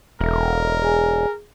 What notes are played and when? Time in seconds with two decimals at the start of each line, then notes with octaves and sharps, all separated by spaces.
0.21 E1 A4 A#4 E5
0.82 G#4 G#5